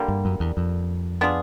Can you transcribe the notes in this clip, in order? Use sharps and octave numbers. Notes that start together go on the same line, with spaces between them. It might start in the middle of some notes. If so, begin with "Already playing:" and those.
Already playing: D3 G3 A#3
G2
F#2
E2
F2
B3 D4 F4 G#4